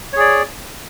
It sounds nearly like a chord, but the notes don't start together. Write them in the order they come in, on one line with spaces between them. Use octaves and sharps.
C#5 G#4 D5